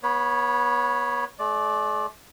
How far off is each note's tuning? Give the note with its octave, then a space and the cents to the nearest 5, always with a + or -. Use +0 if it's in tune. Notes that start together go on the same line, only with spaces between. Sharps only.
B3 -30 C#5 +0 B5 +0
A3 -45 D5 +0